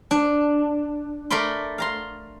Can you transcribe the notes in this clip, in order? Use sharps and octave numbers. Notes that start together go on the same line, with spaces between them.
D4
A3 A#4 D5 B5 C6
F5 A#5 C6